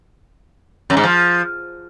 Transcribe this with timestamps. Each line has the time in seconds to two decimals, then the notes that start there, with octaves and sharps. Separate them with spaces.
0.90 F#2
0.97 G#2
1.04 F3